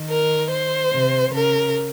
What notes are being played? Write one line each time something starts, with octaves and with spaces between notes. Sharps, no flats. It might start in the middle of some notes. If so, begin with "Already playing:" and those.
Already playing: D#3
A#4
C5
C3
C#3 A#4